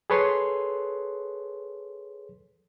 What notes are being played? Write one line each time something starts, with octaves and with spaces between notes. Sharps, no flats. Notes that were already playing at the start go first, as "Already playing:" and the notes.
G#4 A4 B4 C#5 C6